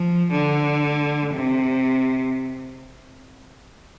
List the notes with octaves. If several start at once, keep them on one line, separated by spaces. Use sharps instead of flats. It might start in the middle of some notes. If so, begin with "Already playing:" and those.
Already playing: F3
D3
C3